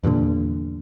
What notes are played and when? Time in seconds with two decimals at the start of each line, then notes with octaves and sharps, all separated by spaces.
0.03 E2 G2 A#2 D3